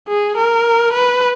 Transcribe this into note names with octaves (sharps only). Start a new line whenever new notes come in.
G#4
A#4
B4